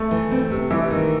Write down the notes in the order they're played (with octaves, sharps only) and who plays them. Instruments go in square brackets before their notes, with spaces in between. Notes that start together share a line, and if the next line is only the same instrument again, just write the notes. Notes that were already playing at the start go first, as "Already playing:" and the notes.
Already playing: [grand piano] A3
[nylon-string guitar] E3
C4
C3
[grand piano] E3 [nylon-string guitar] G3
[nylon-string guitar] D#3